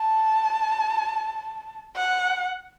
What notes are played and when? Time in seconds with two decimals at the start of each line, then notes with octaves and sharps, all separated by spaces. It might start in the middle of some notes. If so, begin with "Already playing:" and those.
Already playing: A5
1.96 F#5